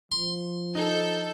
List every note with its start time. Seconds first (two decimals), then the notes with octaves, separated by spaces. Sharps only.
0.12 F3 C6
0.75 D#4 A4 G6